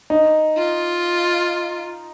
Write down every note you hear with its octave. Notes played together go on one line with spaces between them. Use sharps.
D#4
F4